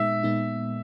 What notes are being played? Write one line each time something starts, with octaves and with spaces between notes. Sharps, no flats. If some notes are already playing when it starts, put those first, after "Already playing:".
Already playing: A#2 G#3 B3 D#4 E5
A#2 G#3 B3 D#4